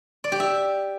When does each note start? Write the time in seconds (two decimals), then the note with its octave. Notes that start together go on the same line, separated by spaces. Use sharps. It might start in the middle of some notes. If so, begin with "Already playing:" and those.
0.24 D5
0.32 G4
0.40 E5